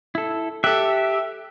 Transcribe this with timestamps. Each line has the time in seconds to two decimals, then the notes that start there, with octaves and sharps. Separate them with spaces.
0.15 E4 A4
0.64 G4 A4 E5 F#6